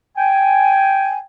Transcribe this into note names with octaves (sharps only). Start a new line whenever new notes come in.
G5 G#5